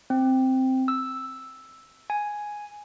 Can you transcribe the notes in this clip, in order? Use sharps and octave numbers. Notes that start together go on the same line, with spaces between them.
C4
E6
G#5